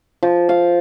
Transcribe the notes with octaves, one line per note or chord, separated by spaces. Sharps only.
F3
F5